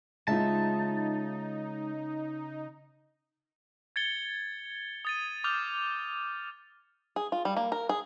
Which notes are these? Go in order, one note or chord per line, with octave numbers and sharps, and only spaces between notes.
C#3 G#3 D#4 F4 E5 A5
G#6 A6 C#7 G7
D#6 A6 D#7
D6 D#6 F6 G6 F7
G#4
F4
G3
A#3
A#4
G#4